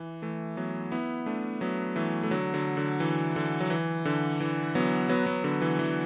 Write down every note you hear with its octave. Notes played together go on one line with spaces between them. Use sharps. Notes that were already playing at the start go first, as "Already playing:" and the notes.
Already playing: E3
E3 A3
F#3 B3
B3 E4
A3 D4
F#3 B3
E3 A3
A3
D3 F#3
D3 F#3
D3
E3
D3
F#3
E3
D3
E3
F#3 B3
F#3 B3
F#3 B3
D3 F#3
E3
E3